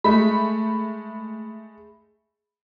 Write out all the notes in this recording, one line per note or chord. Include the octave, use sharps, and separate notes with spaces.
G#3 A3 B5